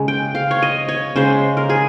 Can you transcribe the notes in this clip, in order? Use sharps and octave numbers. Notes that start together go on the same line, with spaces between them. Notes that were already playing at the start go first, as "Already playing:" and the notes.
Already playing: C#3 G#3
G5
F5
C#5
D#5
C#5
C#3 G#3 C5
A#4
G#4